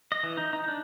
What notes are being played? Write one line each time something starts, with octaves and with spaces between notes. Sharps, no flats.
D#5
E3
D#4
D#4
D4